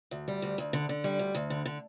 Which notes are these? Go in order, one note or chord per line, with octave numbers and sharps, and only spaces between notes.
D2
G3
D2
D2
D3
D3
G3
D2
D2
D3
D3